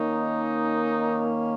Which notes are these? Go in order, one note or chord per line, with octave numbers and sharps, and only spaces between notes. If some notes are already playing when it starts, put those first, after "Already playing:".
Already playing: D#3 A#3 C#4 D#4